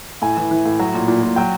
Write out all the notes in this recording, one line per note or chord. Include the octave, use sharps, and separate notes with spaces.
A2 G#5
E3
E3
A2
F#3
A#2
A#2
A#2
F#3 G5